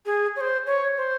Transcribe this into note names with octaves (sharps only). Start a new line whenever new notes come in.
G#4
C#5
C5
C#5
C5